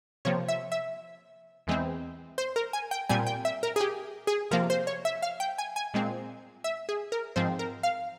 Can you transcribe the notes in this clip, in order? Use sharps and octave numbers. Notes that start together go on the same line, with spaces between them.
C3 F3 A#3 C#5
E5
E5
E2 E3 G#3 C4
C5
A#4
G#5
G5
A#2 G3 C4 G#5
G5
E5
A#4
G#4
G4
G#4
C3 F3 A#3 A#4
C5
C#5
E5
F5
G5
G#5
G#5
A#2 G#3 C4
E5
G#4
A#4
G#2 F3 C4 C5
A#4
F5